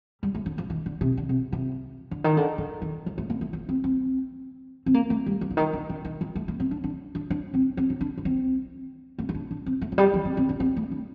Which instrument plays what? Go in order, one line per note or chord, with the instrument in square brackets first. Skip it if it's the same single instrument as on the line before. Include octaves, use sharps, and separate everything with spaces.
[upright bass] G3
A3
D3
F3
D#3
D3
C3
D3
C3
C3
D3
D#3
D3
D3
D#3
F3
A3
A#3
A3
A#3
C4
C4
C4
A#3
A3
G3
F3
D3
D#3
D3
D3
D#3
F3
A3
A#3
C4
D4
D4
D4
D4
C4
C4
D4
D4
D4
C4
A#3
D#4
D4
D4
C4
A3
F3
G3
F3
C4
C4
D4
C4
A3
D4